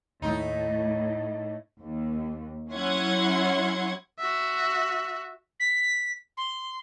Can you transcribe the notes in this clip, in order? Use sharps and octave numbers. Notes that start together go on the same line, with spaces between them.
D#2 A2 D#4
D#2
F#3 C#4 E4 F#5 C6 G#6
F#4 E5
B6
C6